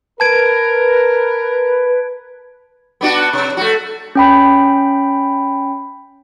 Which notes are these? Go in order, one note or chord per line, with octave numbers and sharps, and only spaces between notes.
A#4 B4 A5 G#6 D7
B3 D4 F#4
C3
A3 F#4
C#4 G5 B5